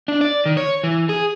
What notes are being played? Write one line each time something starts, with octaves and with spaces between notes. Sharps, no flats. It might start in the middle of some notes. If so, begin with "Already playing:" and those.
D4
D5
D#3
C#5
E3
G#4